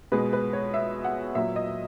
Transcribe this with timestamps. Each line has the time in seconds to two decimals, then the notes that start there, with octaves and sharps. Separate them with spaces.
0.12 B2 G#3 B4
0.33 B4
0.53 C#5
0.74 E5
1.05 F#5
1.35 A#2 F#3 E5
1.56 D#5